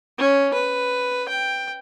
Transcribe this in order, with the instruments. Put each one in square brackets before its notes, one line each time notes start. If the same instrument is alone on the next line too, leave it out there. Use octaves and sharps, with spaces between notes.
[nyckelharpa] C#4
B4
G5